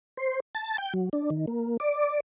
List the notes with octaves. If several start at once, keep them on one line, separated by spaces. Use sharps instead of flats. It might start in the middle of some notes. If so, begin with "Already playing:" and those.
C5
A5
G5
F#3
D4
D#3
A#3
D5